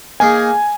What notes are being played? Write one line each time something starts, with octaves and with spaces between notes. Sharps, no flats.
A#3 D#4 G#4 G#5